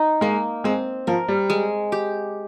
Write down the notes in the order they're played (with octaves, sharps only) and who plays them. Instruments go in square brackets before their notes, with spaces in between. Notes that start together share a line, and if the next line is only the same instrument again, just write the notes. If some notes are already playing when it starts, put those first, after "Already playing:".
Already playing: [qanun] D#4
[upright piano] G#3 [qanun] A#3
[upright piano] G#3 [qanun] C4
[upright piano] F3 [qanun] A#4
[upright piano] G3
[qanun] G#3
G4